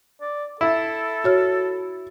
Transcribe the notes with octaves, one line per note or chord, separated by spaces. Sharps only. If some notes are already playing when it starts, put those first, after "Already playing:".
D5
E4 A4
F#4 C#5 F6